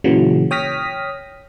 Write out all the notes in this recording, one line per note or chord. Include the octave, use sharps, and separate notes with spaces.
A#2 C#3 E3 F#3
C#5 G5 D#6 F6 A#6 B6